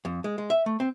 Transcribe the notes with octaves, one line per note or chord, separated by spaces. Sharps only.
F2
G#3
G#3
E5
A3
C4